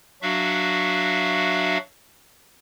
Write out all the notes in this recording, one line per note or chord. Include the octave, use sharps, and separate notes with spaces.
F#3 D4 F#4 E5 F5